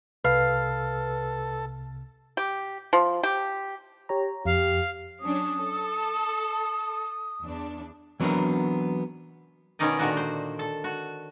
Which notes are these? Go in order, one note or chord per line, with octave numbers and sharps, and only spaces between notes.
C2 C3 A4 B4 F5
G4
F3
G4
G4 C#5 A#5
F2 G4 F5
F#3 C#4 D4 D#6
A4
E2 D4
E3 F#3 B3 C4 D4 A#4
B2 D#3 C#4 D#4 D5 D#5
A#2 D3 D#3 F#4 D5 D#5
C5
A4
F#4